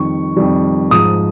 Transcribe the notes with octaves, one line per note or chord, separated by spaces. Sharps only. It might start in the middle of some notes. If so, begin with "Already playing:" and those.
Already playing: F2 D#3 G3 C#6
F2 D#3 G3
G#2 F3 D#6